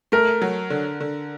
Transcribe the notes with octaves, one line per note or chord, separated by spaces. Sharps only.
A3 A#4
F#3
D3
D3